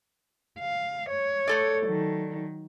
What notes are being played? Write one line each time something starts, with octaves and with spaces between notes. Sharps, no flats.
F5
C#5
A3 A4 D5
D#3 F#3